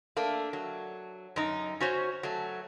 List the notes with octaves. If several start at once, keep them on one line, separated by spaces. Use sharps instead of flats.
A3 A#3 D4
F#3
F#2 D#4
C#4 F#4 C5 C#5
F#3 A3